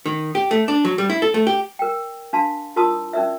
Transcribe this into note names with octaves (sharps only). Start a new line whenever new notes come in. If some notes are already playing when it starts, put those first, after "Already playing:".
D#3
G4
A3
D4
F#3
G3
E4
A4
A3
G4
A#4 G5
D4 F5 A5 C6
E4 F4 A#4 A5 C6 D#6
C#4 D#4 A#4 D5 E5